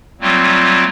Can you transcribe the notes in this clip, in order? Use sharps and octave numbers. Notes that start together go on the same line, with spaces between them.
F#3 G3 A3 A#3 C4 F4